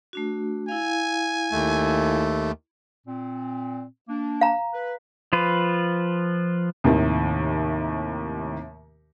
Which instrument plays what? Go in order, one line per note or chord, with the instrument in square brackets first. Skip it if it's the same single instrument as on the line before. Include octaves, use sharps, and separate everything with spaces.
[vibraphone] A3 D4 F#4
[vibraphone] E4 F5 [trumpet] G#5
[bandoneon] D#2 A3
[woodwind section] A#2 C4
A#3 D4
[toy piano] F5 A#5
[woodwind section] B4
[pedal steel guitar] F3 F4 B4
[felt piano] D#2 A2 C3 D#3